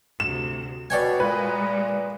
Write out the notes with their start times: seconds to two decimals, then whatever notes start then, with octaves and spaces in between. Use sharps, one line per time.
0.20 D2 C3 E7
0.90 B2 C#5 D5 G5 G#5
1.20 A#2 G#3 B4